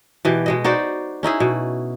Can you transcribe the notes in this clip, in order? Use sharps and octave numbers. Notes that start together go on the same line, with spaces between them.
B2 E3 G4
B2 G#3 D#5
D#4 F#4 C5 D5
C#4 D#4 E4 G#4
B2